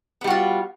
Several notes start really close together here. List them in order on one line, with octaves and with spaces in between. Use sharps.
B3 G3 F#4 F4